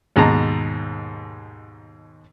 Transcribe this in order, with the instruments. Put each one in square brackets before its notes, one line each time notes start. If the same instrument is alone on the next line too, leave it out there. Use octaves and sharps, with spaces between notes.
[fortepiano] D#2 G#2 B2 A5 A#5